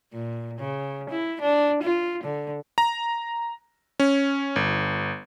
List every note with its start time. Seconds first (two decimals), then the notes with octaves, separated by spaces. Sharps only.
0.13 A#2
0.59 C#3
1.10 E4
1.42 D4
1.83 F4
2.24 D3
2.78 A#5
4.00 C#4
4.56 G1